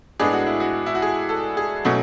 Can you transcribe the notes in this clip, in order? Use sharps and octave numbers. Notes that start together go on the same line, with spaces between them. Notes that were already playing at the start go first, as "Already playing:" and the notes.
A2 G#3 B3 D4 G#4
F#4
E4
F#4
E4
F#4
G#4
A4
G#4
B2 F#3 A3 C#4 F#4